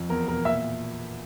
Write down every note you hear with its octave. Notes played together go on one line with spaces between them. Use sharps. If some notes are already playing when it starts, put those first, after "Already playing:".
Already playing: F2
E2 A#4
B2 A#4
A#2 E5